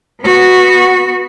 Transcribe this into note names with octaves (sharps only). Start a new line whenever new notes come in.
B3 F#4